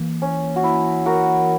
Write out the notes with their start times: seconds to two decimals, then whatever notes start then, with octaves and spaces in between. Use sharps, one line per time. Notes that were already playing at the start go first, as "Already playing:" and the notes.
Already playing: E3 A#3
0.22 C#4
0.56 F#4
0.64 E4
1.06 F#4 A#4